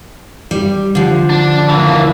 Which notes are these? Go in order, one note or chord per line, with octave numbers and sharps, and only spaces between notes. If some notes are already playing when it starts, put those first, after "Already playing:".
G3
D3 F3
D4
E3 A#3